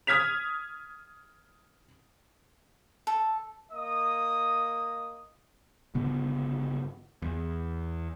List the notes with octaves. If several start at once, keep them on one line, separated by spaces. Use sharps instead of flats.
D#6 F6 G#6 B6 F7
A4
A#3 D#5 D#6
G1 C#3 B3
E2